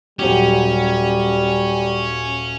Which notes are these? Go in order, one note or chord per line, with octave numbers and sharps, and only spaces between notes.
D#1 F#3 G3 C#4 G4